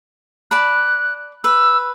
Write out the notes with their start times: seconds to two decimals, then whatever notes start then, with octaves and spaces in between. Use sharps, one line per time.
0.51 D5 A5 B5 F#6
1.44 B4 E6